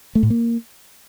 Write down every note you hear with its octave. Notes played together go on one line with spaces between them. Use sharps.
A3
A2
A#3